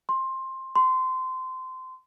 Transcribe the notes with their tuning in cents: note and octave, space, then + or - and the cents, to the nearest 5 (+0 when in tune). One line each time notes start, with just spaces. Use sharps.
C6 +15
C6 -20